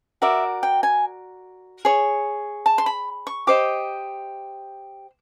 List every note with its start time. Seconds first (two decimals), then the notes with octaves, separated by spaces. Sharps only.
0.22 F#4 A#4 D5 E5
0.63 G5
0.83 G#5
1.85 G#4 C#5
2.66 A5
2.78 C6
2.86 B5
3.27 C#6
3.47 G4 C5 D#5 D6